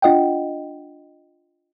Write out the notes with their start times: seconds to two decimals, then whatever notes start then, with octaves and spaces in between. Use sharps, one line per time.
0.02 D4 F4 D#5 F#5 G5